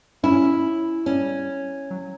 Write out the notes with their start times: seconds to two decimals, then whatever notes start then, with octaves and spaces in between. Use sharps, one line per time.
0.23 C#4 E4
1.06 G3 C#4
1.90 F#3